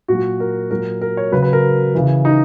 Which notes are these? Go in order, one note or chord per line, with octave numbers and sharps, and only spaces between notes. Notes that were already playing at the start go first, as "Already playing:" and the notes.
A#2 F#3 F#4
A#4
A#2 F#3 A#4
A#4
C#5
C#3 F#3 B4
B4
A#4
C#3 E3
D#4